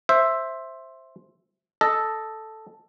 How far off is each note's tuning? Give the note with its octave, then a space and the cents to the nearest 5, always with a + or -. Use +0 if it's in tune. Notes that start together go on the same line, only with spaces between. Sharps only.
C5 +10 E5 +5
A4 +0 D#5 +0